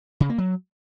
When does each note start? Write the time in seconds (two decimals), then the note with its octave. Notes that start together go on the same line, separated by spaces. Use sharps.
0.20 C#3
0.29 A#3
0.38 F#3